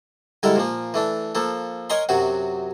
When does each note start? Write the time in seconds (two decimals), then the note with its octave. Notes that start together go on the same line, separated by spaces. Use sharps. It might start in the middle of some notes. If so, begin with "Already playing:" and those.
0.43 D3 G3 G#3 E4 A4 A#4
0.56 A#2 F3 A#3
0.94 E3 A3 D4
1.35 F3 A#3 A4
1.90 A#4 C#5 D#5 G#5 A#5 C6
2.09 F#2 C3 F#3 F#4